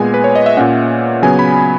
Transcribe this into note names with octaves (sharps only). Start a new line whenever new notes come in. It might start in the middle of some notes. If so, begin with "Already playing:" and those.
Already playing: A#2 G#3 B3 G#5
B4
C#5
D#5
E5
A#2 A#3 C#4 F#5
C#3 F#3 B3 G#5
B5